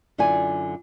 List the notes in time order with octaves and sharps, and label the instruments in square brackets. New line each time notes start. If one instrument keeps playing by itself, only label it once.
[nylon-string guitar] F#2 D3 E4 F4 D5 G#5